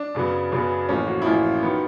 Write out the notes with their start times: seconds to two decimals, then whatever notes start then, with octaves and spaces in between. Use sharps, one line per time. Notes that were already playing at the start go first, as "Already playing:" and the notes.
Already playing: D4
0.15 F#2 C#3 F#3 B3
0.52 F#2 C#3 F#3 B3
0.89 A1 A2 F3 A#3 C#4
1.07 F#4
1.22 E4
1.25 A1 A2 F3 A#3 F4
1.63 D#3 F#3 B3